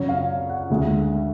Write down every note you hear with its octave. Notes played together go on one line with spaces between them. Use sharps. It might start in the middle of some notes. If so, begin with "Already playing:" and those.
Already playing: F#2 C#3 F#3 C#5
F5
F5
F#5
D2 C#3 G#3